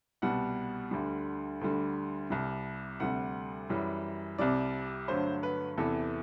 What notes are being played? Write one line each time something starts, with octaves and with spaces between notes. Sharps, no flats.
C2 B2 G3 F#5
D2 D3 G3
D2 D3 G3
C2 C3 G3
D2 C3 G3 F#5
F#2 E3 G3
C2 C3 G3 D5
G2 D3 F#3 A3 C5
B4
E2 C3 E3 A4